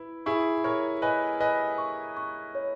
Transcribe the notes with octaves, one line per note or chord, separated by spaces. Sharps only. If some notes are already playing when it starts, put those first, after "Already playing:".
Already playing: E4 B4 B5
E4 G#4 C#6
A#4 C#5 C#6
B4 D#5 G#5
B4 D#5 G#5
C#6
C#6
C#5